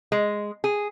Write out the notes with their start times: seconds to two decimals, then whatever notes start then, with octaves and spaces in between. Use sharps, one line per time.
0.12 G#3
0.64 G#4